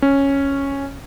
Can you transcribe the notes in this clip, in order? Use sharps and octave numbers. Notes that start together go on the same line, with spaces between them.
C#4